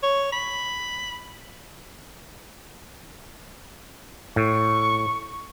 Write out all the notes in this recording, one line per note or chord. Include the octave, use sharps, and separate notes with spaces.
C#5
B5
A2 C#6